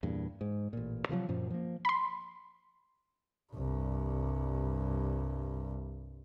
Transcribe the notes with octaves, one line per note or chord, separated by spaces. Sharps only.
E2 G2 A#2
G#2
A1 A#2
C3 D#3 F3 F#3
F#2 A#2 F3
F3 A#3
B5 C6
C2 G2